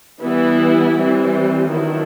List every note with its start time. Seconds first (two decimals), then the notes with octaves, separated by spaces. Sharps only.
0.22 E3 G3 B3 E4
0.95 E3 G3 C4
1.68 D#3 F#3 B3 D4 E4